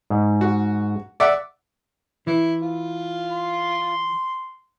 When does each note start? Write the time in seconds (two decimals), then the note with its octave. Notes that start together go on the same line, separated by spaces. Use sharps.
0.10 G#2
0.41 F#4
1.20 D5 E5 F#5
2.27 E3 E4
2.62 F4
3.32 C6